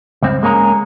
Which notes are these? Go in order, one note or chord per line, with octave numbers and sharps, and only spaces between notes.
C#2 G2 C4
G#3 A#3 C#4 A#4